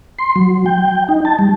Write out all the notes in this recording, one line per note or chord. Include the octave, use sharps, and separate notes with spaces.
C6
F#3
G5
D#4
A5
G3